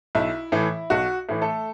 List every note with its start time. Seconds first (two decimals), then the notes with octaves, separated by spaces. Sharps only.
0.15 B1 E4
0.52 A2 E3
0.90 B1 F#4
1.29 A2 E3
1.41 A3 A4